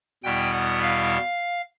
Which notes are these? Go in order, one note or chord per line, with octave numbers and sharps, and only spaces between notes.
E2 B2 G3 B3 E4 G5
F#5
F5